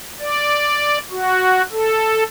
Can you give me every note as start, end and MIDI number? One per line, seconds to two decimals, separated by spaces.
0.20 0.98 74
1.11 1.62 66
1.72 2.23 69